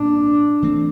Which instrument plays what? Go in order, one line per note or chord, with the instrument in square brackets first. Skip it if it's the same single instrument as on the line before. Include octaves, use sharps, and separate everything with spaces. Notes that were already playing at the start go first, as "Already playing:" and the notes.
Already playing: [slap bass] A#2 G3 C4 [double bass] D4
[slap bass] E3 A3 C4